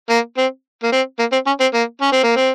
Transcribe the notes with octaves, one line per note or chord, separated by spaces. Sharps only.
A#3
C4
A#3
C4
A#3
C4
C#4
C4
A#3
C#4
C4
A#3
C4